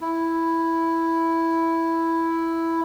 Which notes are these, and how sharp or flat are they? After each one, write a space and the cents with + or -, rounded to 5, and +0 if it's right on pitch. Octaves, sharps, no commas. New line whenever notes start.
E4 +0